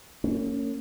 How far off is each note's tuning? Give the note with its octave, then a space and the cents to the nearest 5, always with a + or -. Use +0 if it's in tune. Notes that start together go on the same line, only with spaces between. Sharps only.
A#3 -40 C#4 +0